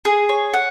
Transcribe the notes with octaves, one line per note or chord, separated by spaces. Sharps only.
G#4
C#5
F#5